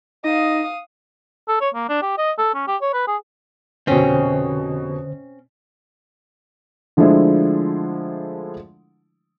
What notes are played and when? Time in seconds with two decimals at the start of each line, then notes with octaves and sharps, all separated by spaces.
0.24 D#4 D#5 F5 D#6
1.49 A4
1.61 C#5
1.74 A#3
1.89 D4
2.02 G4
2.18 D#5
2.38 A4
2.55 C#4
2.68 G4
2.82 C#5
2.94 B4
3.07 G#4
3.87 F1 B2 D3 C4 C#4 C5
6.97 D3 F3 G#3 A3 D4 E4